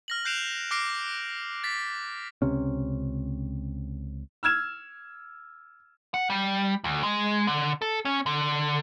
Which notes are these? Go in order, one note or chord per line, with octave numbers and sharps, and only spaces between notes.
F6 A#6 F#7
F#6 G6 C7 D7 E7 F7
D6 F6 A#6 C7 D7
A6 B6
C#2 C3 C#4
E6 F6 G#6 E7
F#5
G3
D2
G#3
D3
A4
C#4
D3